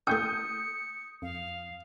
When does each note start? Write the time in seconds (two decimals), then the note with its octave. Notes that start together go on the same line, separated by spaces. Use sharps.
0.07 A3 G5 D#6 G6 C#7
1.22 F2 F5